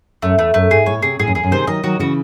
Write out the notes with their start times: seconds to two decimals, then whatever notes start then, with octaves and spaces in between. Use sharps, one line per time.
0.22 F#2 A3
0.38 E2 A3
0.54 F#2 A3
0.71 G#2 G#4
0.86 A2 C#5
1.02 C3 G#4
1.19 A2 G#4
1.27 F#2
1.35 E2 G#4
1.43 F#2
1.51 C3 D#3 C5
1.67 D#3 F#3 D#5
1.84 D#3 F#3 F#4
1.99 C#3 E3 F#4